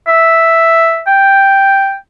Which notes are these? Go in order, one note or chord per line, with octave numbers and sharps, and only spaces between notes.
E5
G5